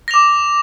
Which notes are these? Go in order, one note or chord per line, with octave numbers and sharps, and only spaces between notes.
D6 A#6 F7